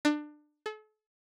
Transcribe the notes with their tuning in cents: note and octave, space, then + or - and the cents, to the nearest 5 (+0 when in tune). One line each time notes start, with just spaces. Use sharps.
D4 +25
A4 -40